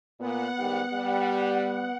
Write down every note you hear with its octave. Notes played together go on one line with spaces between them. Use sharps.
A#2 B3 F#5
G#2 D#3 G3
G3